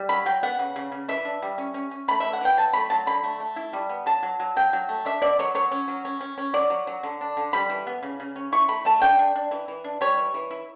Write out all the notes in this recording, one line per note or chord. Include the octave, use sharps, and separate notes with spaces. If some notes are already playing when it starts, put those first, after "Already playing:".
Already playing: G3
F#3 B5
F#3 G5
B3 F#5
C#3
C#3
C#3
E3 E5
D4
G3
C#4
C#4
C#4
A3 B5
E3 E5
F#5
E3 G5
F#3 A5
A3 B5
F#3 A5
D3 B5
A3
A3
E4
G3
B3
F#3 A5
F#3
F#3
F#3 G5
F#3
A3
D4 E5
B2 D5
F#3 C#5
F#3 C#5
C#4
F#3
C#4
C#4
C#4
F#3 D5
F#3
F#3
D3
D4
D3
G3 B5
E3
B3
C#3
C#3
C#4
E4 C#6
A3 B5
A3 A5
D4 G5
D4
D4
E3
E3
D4
G3 C#5
E3
E3
E4